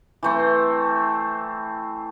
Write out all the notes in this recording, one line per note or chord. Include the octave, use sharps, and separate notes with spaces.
E3 A3 C4